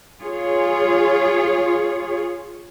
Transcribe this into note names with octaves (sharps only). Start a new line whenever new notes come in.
F4 G#4 C#5